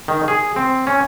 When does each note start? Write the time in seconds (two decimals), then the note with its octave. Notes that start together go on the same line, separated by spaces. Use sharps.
0.08 D#3
0.28 G#4
0.56 C4
0.87 C#4